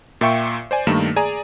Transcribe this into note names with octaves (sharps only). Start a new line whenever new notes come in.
A#2 F4 E5 G5 C#6 C#7
C5 D5 G#5
G2 D#3 A3 A#3 E7
G#4 D5 G#5 A#5 D#6